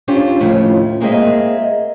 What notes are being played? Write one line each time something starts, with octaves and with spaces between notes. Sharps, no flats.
C#4 D4 F4 G4 C5
D#2 A2 C#3 F3
G#3 A#3 C4 G#4 D#5 E5